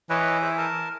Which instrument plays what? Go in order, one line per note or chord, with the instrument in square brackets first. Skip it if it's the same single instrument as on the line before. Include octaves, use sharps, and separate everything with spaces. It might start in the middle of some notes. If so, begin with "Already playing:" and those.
[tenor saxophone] E3 [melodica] B4 C#5 D#5
[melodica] G#4 C5 E5
A#4 A5